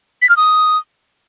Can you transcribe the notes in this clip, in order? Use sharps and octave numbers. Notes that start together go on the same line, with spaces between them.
B6
F6
D#6